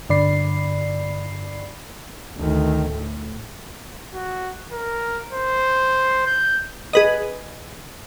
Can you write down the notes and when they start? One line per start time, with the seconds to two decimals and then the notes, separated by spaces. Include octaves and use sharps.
0.10 G2 D3 D5 B5 C7
2.37 D2 D#3
2.90 A2
4.14 F#4
4.71 A#4
5.32 C5
6.26 G6
6.93 G#4 B4 D#5